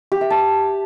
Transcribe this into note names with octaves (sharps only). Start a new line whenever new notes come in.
G4
E5
A5